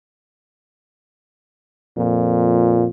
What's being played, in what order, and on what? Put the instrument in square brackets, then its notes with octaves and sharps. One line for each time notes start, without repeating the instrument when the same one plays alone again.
[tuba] F2 [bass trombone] A#2